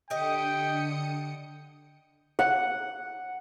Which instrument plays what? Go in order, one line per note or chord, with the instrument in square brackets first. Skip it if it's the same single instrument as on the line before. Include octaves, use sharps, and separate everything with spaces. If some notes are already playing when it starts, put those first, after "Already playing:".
[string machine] D3 D#6 C#7 [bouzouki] G4 D#5 [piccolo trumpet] G5
[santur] F#5